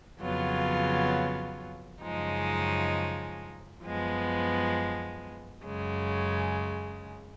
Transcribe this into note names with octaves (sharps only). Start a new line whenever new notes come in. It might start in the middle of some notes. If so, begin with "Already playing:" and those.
F2 C#3 F#3 B3 F4
F#2 C#3 F3 G#3 D#4
F#2 F3 G#3 B3
F#2 C#3 G#3